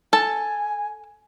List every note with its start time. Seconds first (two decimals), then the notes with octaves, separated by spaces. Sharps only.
0.13 A4 G#5 A5